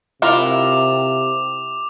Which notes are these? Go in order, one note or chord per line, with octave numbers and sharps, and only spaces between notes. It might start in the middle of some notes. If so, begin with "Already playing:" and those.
C3 E4 F4 A#4 D6 F7